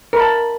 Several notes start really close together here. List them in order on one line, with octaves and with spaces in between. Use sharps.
A#4 B5 A5